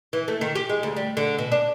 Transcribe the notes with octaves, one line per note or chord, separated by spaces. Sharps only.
E3
A3
D#3
G4
G#3
D2
G3
D3
B2
D4